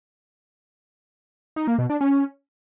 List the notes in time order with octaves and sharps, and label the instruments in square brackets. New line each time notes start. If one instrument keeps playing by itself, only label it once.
[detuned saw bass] D#4
A#3
B2
D4
C#4